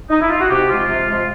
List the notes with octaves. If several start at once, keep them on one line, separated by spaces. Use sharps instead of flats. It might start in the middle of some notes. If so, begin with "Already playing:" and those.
D#4
E4
F4
F#4
C3 G4
F3 G#3 F4
C3
F3 G#3